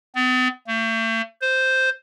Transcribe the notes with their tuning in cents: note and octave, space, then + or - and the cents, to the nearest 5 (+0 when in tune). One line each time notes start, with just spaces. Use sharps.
B3 +45
A3 +40
C5 -5